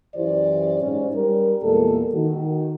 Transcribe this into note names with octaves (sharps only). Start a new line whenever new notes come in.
F#2 E3 E4 G4 C5 D5
G#2 C#4
G3 A#4
E2 A#2 G#3 A#3 A4
D#3 F#4